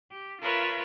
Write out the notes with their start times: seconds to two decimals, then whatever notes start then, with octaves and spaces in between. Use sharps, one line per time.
0.12 G4
0.41 F4 A#4 B4 C#5 E5